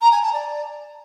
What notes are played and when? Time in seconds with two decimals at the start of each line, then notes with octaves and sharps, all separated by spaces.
0.01 A#5
0.12 G#5
0.22 A5
0.33 D5